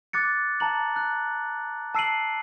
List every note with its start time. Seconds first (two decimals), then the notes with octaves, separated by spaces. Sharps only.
0.13 D6 F#6 A6 C#7
0.60 A5 A#5 F#7
0.96 F#6
1.94 A5 E6 C7 D7 D#7 F#7